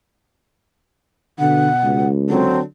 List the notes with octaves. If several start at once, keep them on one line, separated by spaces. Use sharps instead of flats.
B2 D3 F#5
C#2
D3 F#3 C4 A4